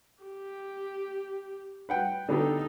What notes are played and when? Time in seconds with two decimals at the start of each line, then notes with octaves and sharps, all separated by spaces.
0.23 G4
1.89 B4 F#5 G5
2.29 D3 B3 D#4 G4 A4